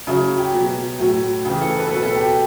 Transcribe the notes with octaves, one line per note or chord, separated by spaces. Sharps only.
C#3 F#3 E4
G4
B2 F#3
A2 F#3
C#3 E3 G4
A4
B4
A4
B2 F#3 B4
A4
G4
G4